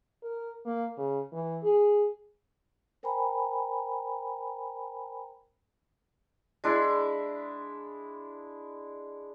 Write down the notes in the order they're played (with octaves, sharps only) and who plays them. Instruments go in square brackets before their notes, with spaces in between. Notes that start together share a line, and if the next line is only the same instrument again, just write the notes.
[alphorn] A#4
A#3
C#3
E3
G#4
[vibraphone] A#4 C5 G5 G#5 A#5 B5
[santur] G#3 D4 E4